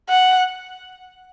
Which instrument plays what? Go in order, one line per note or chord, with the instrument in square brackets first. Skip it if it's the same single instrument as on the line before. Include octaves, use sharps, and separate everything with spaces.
[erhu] F#5